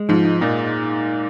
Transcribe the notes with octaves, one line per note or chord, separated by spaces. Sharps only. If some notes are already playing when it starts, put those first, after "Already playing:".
Already playing: G#3
G#2 F3
D#4
A#2 D#4